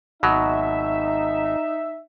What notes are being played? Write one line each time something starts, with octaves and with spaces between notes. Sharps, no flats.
G#1 B2 F#3 D#4 E5